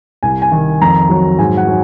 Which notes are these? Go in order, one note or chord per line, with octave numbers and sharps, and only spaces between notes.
C2 G#5
G#5
D#3
F2 A#5
F#3
G#2 G#5
F#5
F#3